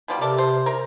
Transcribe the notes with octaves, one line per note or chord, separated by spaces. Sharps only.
B2 F3 G3
C3 A4 A#4 D5
C5
A#4 A#5